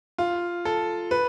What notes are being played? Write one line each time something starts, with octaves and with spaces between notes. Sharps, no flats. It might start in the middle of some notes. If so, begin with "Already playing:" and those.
F4
A4
B4